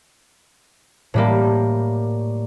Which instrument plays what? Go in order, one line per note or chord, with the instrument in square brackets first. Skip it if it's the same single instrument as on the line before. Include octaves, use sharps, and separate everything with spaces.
[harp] A2 G3 A#3